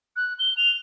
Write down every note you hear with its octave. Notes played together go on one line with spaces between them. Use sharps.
F#6
G7
F7